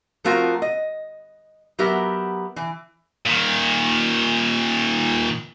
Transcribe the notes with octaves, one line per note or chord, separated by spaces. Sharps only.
F3 A3 C4 F4 F#4 A#4
D#5
F#3 B3 G4 A#4 E5
E3
A#2 D#3